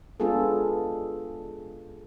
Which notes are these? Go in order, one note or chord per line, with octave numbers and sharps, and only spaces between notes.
G#3 B3 D4 F4 G#4 A4